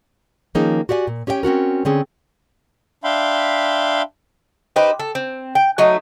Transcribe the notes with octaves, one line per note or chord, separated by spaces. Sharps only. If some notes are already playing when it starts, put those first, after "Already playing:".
D#3 F3 A#3 C#4 D#4 G#4
F#4 G4 D5 F5 G#5
A#2
C#4 G4 C#5 D#5 G5
C4 C#4 F#4 A#4
D3 C4 C#4 G#4
D4 E5 F5 G5 B5 C6
D#4 G4 B4 C5
A4
C4
G5
F#3 A3 D#4